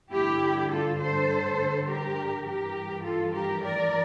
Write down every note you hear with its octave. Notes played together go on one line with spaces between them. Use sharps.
G2 D3 E4 G4
F4 A4
A4 C5
G4 A#4
G2 E3 G4 A#4
F4 A4
G4 A#4
A#4 D5